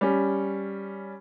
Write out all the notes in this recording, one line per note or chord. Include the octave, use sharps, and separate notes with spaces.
G3 C#4